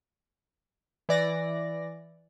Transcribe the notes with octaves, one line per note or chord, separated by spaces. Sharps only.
E3 D5 A#6